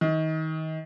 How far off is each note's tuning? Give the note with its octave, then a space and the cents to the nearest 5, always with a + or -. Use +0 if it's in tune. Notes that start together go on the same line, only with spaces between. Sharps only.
D#3 +30